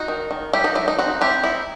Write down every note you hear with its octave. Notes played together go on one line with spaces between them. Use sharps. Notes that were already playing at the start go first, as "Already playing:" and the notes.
Already playing: D#4 F#4
D#3
D#3
F#3 E4 G4
D#4 F#4
F#3 E4
D#4
C4 D#4 F#4
C4 E4 G4
D#4 E4